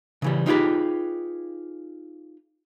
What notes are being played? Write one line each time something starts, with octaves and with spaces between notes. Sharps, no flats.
C#3 E3 G3
D#4 F4 G4 G#4 B4